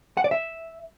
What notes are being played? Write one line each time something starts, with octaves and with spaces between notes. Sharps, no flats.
F#5
D5
E5